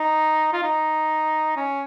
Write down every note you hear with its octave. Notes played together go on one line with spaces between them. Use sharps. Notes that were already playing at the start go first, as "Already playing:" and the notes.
Already playing: D#4
F4
D#4
C#4